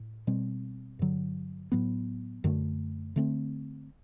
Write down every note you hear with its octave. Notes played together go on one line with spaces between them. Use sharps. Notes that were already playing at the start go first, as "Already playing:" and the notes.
Already playing: A2
B2 G3 C4
G2 D3 F#3
A2 F#3 B3
F#2 D3 A3
D3 A3 C4